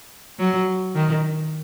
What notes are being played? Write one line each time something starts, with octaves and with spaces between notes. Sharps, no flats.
F#3
D#3